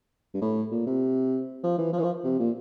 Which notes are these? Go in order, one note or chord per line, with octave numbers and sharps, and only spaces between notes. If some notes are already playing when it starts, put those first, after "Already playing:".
G2
A2
A#2
C3
F3
E3
F3
E3
F3
C3
A#2